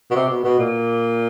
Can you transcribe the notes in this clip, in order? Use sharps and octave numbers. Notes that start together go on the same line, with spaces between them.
B2
C3
B2
B2
A#2